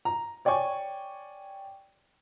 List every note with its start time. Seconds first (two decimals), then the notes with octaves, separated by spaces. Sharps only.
0.05 A#5
0.45 C#5 D5 G5 G#5 C#6